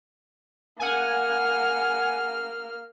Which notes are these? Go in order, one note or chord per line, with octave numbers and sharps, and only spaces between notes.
A#3 F#5 G#5 F6